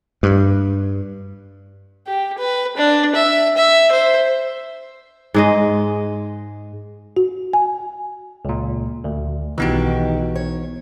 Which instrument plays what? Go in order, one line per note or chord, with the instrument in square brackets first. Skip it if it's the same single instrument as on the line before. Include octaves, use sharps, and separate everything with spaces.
[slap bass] G2
[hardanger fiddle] G4
B4
D4
E5
E5
C5
[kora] G#2 G#3 D#5
[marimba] F#4
G#5
[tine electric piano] C#2 A#2
D2
[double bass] B1 [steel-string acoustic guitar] D#3 F#4 G4 [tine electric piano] E3 B3 D#4
[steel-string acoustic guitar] C#5